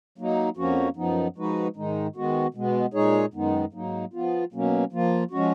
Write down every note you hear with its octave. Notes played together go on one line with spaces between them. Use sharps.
F#3 A#3 D#4
F2 F3 A#3 C#4 F#4
F#2 F3 B3 D#4
F3 G#3 D#4 F#4 B4
G#2 D#3 G#3 D#4
D#3 G#3 B3 F#4
B2 G#3 B3
A#2 G#3 D#4 G#4 C#5
F#2 D#3 G#3 B3 D#4
G#2 F#3 A#3 D#4
F3 B3 F4
B2 F#3 A#3 C#4
F3 A#3 F4
F3 G#3 C#4 F#4